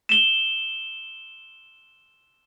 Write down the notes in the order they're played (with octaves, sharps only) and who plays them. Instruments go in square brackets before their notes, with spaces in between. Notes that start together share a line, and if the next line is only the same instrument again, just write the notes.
[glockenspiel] E7 G7